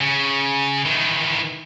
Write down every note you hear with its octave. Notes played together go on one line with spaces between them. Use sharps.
C#3
D#3 E3